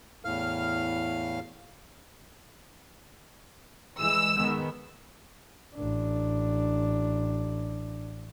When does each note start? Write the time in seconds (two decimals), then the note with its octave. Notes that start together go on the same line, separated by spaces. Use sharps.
0.25 E2 A2 F5 F6
4.00 E3 G#3 E6
4.37 D#3 G#3 B3
5.76 A1 D4